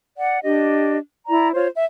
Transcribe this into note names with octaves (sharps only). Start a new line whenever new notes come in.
D5 F#5
D4 G4 D#5
E4 D5 A#5
F4 C5 C#5
E5